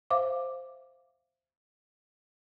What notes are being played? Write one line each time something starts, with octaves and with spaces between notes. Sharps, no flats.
C5 E5 F5 D6